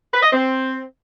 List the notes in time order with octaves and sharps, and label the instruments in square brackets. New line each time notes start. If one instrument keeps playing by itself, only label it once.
[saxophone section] B4
D#5
C4